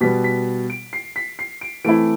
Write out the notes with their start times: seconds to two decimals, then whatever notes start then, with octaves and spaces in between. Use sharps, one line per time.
0.01 B2 G3 B3 B6
0.24 B6
0.70 D7
0.93 C7
1.16 B6
1.39 C7
1.61 D7
1.84 E3 A3 C4 E4 D7